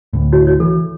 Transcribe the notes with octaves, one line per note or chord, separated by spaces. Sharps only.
D2 A2
E4 F#4 C#5
C#5
E3 A4